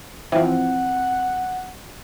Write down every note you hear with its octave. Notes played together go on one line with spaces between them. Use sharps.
E3 F3 C4 F#5